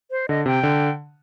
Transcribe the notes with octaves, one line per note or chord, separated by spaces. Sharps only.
C5
D3 D#5
C3 G5
D3